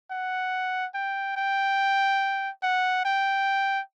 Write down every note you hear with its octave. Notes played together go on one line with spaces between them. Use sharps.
F#5
G5
G5
F#5
G5